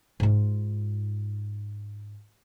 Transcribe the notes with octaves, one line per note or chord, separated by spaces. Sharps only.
G#2 F4